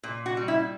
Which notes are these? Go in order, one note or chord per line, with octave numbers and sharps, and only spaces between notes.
A#2
F#4
G3
E4